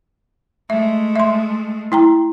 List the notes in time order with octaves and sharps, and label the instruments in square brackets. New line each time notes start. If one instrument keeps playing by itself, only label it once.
[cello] G#3 A3 [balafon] E5
[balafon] E5 C6
E4 G5 A#5